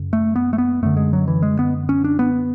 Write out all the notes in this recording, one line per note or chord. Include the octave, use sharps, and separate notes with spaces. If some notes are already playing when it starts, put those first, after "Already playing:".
Already playing: F#2 C#3
A3
B3
A3
B3
F#2 D3 A3
G#3
F#3
E3
G#3
B3
C#4
D4
B3